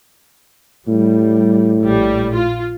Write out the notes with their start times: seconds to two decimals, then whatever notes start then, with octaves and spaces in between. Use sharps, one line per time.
0.88 A2 G3
1.82 A#1 G3
2.35 F4